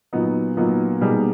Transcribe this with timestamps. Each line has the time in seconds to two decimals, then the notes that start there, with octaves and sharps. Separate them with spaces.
0.13 A#2 F#3 B3 D#4
0.57 A#2 F#3 B3 D#4
1.01 B2 G3 A#3 D#4 G#4